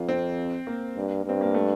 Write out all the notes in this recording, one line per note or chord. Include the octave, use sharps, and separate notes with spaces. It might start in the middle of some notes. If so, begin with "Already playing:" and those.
Already playing: F2 F4
C4
A#3
G2
G2 C4
A#3
A3